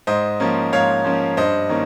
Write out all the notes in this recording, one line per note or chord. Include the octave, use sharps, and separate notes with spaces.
G#2 C5 D#5
F3 A#3 C#4
G#2 C#5 F5
F3 A#3 C#4
G2 C5 D#5
D#3 A#3 C#4